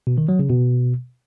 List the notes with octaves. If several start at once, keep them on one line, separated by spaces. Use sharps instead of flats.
B2
D#3
F#3
C#3
B2